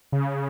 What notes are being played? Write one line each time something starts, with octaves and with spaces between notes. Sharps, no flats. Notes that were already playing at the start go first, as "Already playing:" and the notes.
C#3